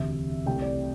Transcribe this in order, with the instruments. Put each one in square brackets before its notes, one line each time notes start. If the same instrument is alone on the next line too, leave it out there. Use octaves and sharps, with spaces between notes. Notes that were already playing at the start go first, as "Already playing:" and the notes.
Already playing: [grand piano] E1 D2 C3 E5
C2 C3 A3 G5
D5